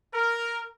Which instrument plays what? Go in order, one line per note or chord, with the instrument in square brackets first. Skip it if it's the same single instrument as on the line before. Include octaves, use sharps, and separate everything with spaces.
[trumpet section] A#4